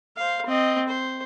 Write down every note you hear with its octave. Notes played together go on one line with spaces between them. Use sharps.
C5 F5
C4 D#5
C5